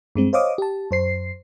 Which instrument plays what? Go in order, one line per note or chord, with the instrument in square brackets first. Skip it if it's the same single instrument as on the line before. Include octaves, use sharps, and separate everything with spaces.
[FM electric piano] G2 G#3 C4
C5 C#5 D#5 F5 D6 D#6
G4 A5
F#2 C5 C7